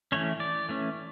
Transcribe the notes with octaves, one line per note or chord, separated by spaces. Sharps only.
E3 A3 C#4 C#5
D5
E3 A3 C#4